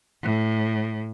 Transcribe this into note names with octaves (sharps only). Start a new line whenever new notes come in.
A2